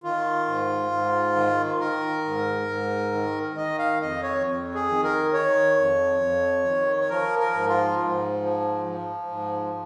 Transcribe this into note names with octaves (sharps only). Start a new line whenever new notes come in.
D#3 F4
G#2
G#2
D#3
D#3 A#4
G#2
G#2
D#3
D#3 D#5
F5
F2 D#5
C#5
F2
G#4
D#3
A#4
D#3 C#5
F2
F2
D#3
C#5
F3 A#4
A#4
G#2
F4
G#2
F3
F3
G#2